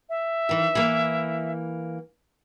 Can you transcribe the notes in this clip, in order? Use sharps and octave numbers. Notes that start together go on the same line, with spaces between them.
E5
D#3 E3
E3 A#3